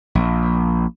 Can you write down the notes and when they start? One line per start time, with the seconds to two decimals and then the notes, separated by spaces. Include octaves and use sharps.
0.15 A#1